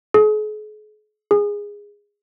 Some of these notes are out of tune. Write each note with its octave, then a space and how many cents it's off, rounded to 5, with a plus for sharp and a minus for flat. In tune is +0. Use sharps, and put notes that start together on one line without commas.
G#4 +45
G#4 -15